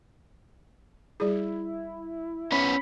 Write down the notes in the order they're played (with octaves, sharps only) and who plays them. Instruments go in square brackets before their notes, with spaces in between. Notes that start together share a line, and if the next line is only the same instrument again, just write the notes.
[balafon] G3 G#4 [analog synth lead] E4
[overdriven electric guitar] B3 C#4 [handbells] B5 B6 C#7